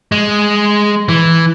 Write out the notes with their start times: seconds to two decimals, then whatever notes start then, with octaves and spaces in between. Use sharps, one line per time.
0.12 G#3
1.09 E3